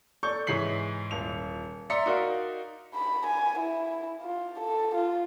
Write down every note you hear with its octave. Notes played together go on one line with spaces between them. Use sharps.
A4 D5 C#6 G6
G#2 E3 C#5 B6 C7 F#7
D#1 F7
D5 E5 A#5 C6 B6 C#7
D#4 F#4 A#4 D5 F5
B5
G#5
E4
F4
A4
F4